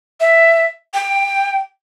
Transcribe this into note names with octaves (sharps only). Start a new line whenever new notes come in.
E5
G5